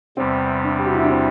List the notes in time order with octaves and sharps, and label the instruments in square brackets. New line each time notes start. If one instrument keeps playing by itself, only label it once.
[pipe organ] E2 C3 G3 [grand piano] C4
[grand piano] D4
G4
F#4
E4
D4
C4